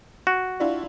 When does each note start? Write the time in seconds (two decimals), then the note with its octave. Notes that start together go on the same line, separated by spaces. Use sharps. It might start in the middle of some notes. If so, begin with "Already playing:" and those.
0.27 F#4
0.60 D4 E4 F4